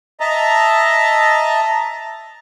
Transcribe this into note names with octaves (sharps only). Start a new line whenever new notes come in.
D#5 E5 A5 A#5